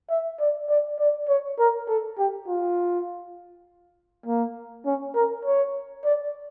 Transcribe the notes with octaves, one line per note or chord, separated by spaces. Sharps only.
E5
D5
D5
D5
C#5
A#4
A4
G4
F4
A#3
C#4
A#4
C#5
D5